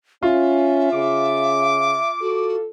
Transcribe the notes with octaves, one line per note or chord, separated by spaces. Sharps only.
C#4 F4 E5
C#3 D6
F#4 A4